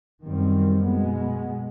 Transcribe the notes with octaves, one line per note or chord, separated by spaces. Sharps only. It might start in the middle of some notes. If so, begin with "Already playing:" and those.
F#2 D#3 G3 C4
B2 G#3 B3